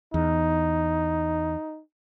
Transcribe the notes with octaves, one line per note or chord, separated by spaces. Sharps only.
E2 D#4